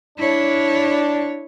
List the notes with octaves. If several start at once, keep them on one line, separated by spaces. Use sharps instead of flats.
D4 E4 C#5